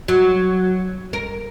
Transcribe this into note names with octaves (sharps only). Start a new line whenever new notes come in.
F#3
A#4